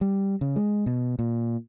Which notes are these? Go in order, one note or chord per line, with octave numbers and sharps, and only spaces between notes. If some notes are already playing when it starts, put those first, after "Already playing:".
G3
C#3
G#3
B2
A#2